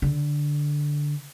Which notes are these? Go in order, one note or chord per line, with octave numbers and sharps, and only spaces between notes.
D3